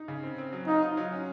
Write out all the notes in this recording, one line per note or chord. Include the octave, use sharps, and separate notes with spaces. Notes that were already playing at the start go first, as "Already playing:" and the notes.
Already playing: D#4
C#3
C4
C4
F#3
D#4 F4
F4
F#3
C#4